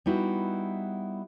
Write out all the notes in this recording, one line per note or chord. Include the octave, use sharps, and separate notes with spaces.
G3 B3 D#4 E4 F#4